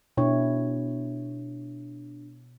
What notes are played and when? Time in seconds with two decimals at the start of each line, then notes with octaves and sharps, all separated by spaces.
0.17 B2 D4 E4 C#5